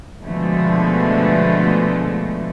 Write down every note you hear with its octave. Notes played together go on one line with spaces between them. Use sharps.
B2 D3 F3 G#3 A3